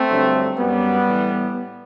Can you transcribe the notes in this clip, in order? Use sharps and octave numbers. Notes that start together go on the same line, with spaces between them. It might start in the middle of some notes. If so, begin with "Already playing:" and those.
Already playing: A3 C4
G2 D3 F#3
F#2 F#3 G3 B3
A2 E3